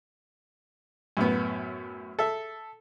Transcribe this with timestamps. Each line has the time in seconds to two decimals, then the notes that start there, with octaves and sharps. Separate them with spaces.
1.17 F#2 A2 B3
2.19 A4 E5